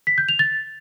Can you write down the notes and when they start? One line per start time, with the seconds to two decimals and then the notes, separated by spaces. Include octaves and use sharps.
0.07 B6
0.18 G6
0.29 F7
0.39 A6